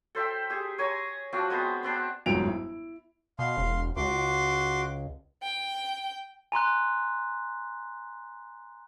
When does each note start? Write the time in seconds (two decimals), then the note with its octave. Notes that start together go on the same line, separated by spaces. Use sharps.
0.15 A4 C5 E5 G5
0.50 G4 G#4
0.78 C#5 G#5 A#5
1.33 F3 C4 D4 F#4
1.50 G#3 B3 C4 C5
1.83 B3 C4 D4
2.26 G1 F2 G#2 F#3 D7 F7
2.47 E4
3.39 B2 F5 C6
3.57 E1
3.96 C#2 F#4 C6 D6
5.43 G5
6.52 G#5 A#5 C6 F#6